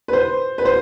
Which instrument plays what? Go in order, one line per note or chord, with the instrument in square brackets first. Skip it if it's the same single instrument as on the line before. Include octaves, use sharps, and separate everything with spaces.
[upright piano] B4
C5
B4
C5